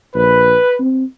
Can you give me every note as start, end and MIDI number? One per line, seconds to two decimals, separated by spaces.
0.14 0.56 34
0.14 0.76 71
0.80 1.04 60